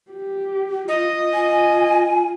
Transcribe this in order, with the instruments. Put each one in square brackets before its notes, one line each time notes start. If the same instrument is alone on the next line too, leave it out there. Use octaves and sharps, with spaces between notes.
[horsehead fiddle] G4
[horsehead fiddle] F4 [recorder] D#5
[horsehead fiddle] F4 [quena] G#5